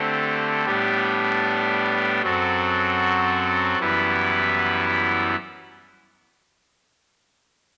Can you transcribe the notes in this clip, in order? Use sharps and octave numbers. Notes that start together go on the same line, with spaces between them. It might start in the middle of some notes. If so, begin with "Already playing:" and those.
Already playing: D3 A3 C4 G4
A2 G3 B3 D4 G4
F#2 F#3 C4 F#4 A4
F#2 E3 G3 B3 E4